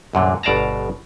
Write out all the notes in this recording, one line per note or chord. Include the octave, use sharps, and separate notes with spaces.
C2 F#2 A#2 D3
G1 B2 D5 F5 A5 A#5